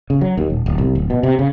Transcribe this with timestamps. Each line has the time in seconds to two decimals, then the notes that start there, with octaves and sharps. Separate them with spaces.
0.10 C#3
0.21 F#3
0.38 D#2
0.50 D#1
0.66 D1
0.78 C2
0.95 D1
1.10 B2
1.23 C3
1.39 C#3